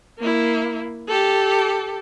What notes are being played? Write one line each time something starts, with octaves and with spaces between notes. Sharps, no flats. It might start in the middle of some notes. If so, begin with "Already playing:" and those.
A#3 E4
G4 A4